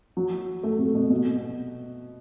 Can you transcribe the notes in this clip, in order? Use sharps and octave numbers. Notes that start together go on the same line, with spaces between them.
F#3
A3
C3
B2
B2